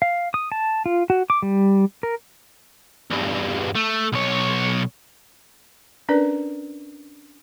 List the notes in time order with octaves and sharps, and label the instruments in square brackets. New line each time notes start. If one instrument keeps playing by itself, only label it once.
[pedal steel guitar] F5
D#6
A5
F4
F#4
D6
G3
A#4
[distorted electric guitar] E2 G2
A3
B1 C#5
[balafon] C#4 D4 A#4 B4 D5